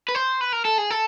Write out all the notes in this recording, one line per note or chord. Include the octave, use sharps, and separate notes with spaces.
B4
C5
B4
A#4
A4
G#4
A4